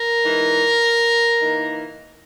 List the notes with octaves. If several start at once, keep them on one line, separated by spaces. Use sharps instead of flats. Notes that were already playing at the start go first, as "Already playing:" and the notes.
Already playing: A#4
E3 G#3 D#4
E3 A#3 D#4